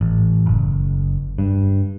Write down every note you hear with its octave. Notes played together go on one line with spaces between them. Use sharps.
A1
F#1
G2